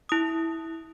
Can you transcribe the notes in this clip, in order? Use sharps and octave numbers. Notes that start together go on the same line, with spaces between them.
E4 D#6